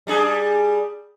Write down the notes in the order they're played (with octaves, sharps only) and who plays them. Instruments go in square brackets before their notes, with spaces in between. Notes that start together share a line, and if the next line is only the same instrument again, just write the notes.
[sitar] G3 D4 G#4